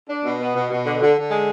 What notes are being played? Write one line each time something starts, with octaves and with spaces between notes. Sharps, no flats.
D4
B2
B3
B2
B2
D3
D3
D3
G#3